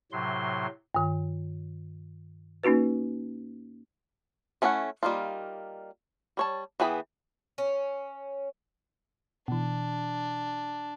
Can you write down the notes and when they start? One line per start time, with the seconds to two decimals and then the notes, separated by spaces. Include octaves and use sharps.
0.12 A2 C3 F#3 C6
0.95 G2 D#3
2.63 A#3 C#4 D#4 F#4 B4
4.62 A3 C#4 E4 D5 F#5
5.03 G3 A#3 D#4 F4
6.37 G3 C#5 A5
6.80 E3 B3 G#4 G5 B5
7.58 C#4
9.48 B2 E3 D4